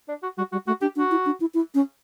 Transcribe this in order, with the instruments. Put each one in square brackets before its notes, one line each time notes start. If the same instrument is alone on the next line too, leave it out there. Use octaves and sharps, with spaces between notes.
[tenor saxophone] D4
F#4
[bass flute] G3 [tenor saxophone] F#4
[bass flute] G3 [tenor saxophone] F#4
[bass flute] A3 [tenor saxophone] F#4
[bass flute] D4 [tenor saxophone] G4
[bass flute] D4 [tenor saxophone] F#4
[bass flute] E4
D4
E4
E4
C#4